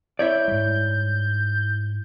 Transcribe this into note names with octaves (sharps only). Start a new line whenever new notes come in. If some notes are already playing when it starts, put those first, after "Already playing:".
E4 C#5 D5 G6
G#2 G3